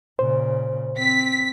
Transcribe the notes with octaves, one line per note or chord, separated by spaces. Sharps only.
A#2 C#3 C5
C4 B6